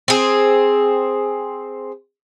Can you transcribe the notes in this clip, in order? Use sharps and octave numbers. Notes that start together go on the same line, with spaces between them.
C4 G#4